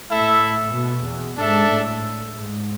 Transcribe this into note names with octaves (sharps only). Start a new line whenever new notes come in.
A2 E4 A4 E5
B2
E2
G#2 D4 A4 E5
A2
G#2